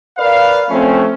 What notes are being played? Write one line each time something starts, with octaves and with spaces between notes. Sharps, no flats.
A#4 B4 D5 F5
F3 A3 C4 C#4